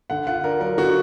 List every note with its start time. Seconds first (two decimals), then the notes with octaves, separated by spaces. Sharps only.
0.10 D3 F#5
0.27 F4 F#5
0.44 D4 A#4
0.60 F#3 A#4
0.77 D3 F#4